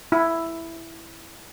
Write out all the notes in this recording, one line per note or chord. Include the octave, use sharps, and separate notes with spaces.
E4